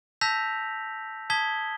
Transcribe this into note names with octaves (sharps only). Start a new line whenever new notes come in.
A5 E6 G6 A#6 B6 F7
A5 D#6 G#6 B6 G7